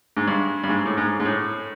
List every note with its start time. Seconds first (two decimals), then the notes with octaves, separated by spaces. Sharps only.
0.17 G#2
0.28 G2
0.64 G2
0.69 G#2
0.85 A2
0.98 G#2
1.20 G#2
1.25 A2